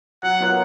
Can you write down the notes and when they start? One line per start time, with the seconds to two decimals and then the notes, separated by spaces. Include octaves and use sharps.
0.23 F#3 F#5
0.40 B3 F4 A#4 C#5